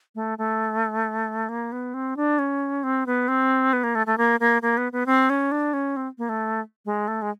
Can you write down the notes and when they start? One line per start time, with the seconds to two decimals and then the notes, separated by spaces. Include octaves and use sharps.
0.15 A3
0.38 A3
1.49 A#3
1.72 B3
1.94 C4
2.17 D4
2.39 C#4
2.83 C4
3.06 B3
3.28 C4
3.73 B3
3.84 A#3
3.95 A3
4.07 A3
4.18 A#3
4.40 A#3
4.62 A#3
4.77 B3
4.92 B3
5.06 C4
5.30 C#4
5.52 D4
5.73 C#4
5.96 C4
6.18 A#3
6.29 A3
6.86 G#3
7.08 A3
7.22 G#3